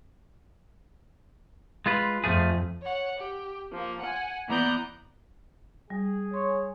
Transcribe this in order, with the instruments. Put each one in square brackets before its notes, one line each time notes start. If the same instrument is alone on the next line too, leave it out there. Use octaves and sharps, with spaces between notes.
[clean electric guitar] G#3 F4 B4
[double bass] F2 [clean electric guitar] F3 A3 G#4
[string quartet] C#5 F#5
G4
F3 A#3
F#5 G#5
E3 B3 D5 A#5 F#6 G6
[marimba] G3 [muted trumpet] G#4
[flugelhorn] C#5 [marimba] C6